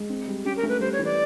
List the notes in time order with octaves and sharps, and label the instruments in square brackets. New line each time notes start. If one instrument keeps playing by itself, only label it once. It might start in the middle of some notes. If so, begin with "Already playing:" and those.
Already playing: [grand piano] G#3
C4
G3
[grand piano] C#4 [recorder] G4
[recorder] A#4
[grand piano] A3
[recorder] B4
[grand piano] G3 [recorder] C5
[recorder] C#5
[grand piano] E3
[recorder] D5